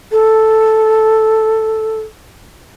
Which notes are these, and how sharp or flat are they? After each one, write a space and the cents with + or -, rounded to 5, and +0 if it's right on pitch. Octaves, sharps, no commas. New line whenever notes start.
A4 +0